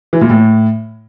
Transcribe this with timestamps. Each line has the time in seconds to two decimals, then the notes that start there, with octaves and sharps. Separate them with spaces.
0.13 E3
0.21 A#2
0.30 A2